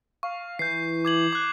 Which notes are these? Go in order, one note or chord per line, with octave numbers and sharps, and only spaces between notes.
F5 C#6
E3 G6 C7
D6 G#6 F#7
D6 F#6